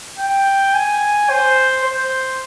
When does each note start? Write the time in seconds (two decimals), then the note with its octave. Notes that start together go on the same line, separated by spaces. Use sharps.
0.19 G5
0.74 G#5
1.30 C5
1.84 C5